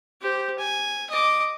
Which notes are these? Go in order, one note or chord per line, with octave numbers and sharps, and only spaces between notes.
G4 C5
G#5
D#5 D6